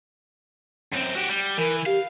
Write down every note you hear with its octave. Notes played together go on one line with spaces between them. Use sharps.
F#2 C4
F#4 G4
G3
E3 A#4
G4 F5